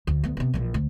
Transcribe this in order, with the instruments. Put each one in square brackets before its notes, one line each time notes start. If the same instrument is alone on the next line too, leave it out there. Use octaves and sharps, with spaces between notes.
[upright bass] D2
D2 B3
C3 B3
A#1 E3
D2